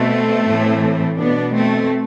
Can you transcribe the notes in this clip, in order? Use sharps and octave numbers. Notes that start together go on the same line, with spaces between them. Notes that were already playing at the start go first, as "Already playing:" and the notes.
Already playing: B2 A3 C4
A2 E3
B2 B3 D4
A3 C4